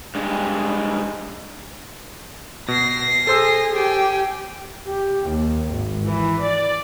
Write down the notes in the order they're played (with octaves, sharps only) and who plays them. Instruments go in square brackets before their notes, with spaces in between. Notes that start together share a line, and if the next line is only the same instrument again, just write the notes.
[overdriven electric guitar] G2 G#3
[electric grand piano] B2 [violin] A#6 C7
[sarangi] G#4 [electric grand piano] A4 C5 E6
[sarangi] G4 [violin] G5 G#5
[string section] G4
D#2
G#1
E3
D5